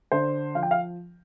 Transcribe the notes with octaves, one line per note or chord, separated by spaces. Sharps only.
D3 C5
F3 F5
G5
F5